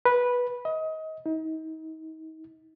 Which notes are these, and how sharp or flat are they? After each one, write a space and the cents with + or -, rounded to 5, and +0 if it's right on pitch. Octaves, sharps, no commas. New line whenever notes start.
B4 -10
D#5 +25
D#4 +35